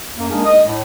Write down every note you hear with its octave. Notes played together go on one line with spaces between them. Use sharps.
F#2 A#3
G#3 A#3 D4 D#4 G#4 A#4
D#5
A2